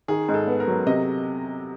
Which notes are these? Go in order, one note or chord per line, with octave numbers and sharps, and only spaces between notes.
D#3 G#4
G#2
A4
B3
A#4
F#3
C3 D#5